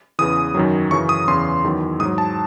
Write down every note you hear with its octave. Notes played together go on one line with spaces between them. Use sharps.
E2 C#3 E3 D#6
F#2 D#3 F#3
F#2 C#3 E3 C#6
D#6
E2 C#3 E3 C6
E2 D#3 F#3
G#2 D#6
F#3
A5